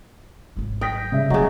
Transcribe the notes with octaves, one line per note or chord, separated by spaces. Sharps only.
G#1 F#3
G5 D#6 A#6 B6
C#3 G3 E5
D1 C#2 C#3 F#3 D#5